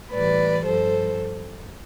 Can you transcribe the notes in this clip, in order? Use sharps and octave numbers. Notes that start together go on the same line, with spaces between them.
A2 E3 G3 B4 D5
G2 F3 A4 C5